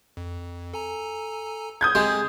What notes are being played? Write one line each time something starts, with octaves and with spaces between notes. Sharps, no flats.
F2
A4 G#5 A#5
D#6 G6 G#6
G#3 C4 G4 G#4